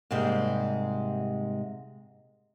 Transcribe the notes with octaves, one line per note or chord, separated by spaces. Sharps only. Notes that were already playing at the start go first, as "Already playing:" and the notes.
G#2 C3 G3 G#3 A#3